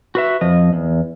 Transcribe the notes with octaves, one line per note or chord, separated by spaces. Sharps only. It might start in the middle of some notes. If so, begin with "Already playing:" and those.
F#4 B4 E5
F2 F3 D#5
E2